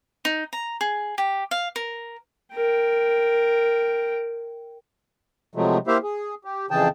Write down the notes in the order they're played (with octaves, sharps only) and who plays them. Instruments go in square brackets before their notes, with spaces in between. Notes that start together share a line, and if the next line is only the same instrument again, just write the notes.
[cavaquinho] D#4
A#5
G#4
G4
F5
A#4
[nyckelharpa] A#4 G5
[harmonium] C3 F3 F#3 G#3 A3
A#3 E4 G4 C5 E5 F5
G#4
G4
F2 C#3 E3 G#4 G5 A5